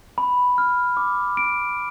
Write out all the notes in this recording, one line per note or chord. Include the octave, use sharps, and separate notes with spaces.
B5
F6
D6
D7